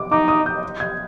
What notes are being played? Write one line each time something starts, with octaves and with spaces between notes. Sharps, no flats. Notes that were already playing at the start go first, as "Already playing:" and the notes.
Already playing: D6
D#4 D6
D#6
G6
G#6